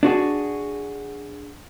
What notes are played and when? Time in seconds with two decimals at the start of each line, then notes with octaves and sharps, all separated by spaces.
0.03 D4 F#4 G#4